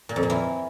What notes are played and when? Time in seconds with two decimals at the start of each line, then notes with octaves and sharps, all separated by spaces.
0.09 A#2
0.16 F2
0.23 A#2
0.30 E3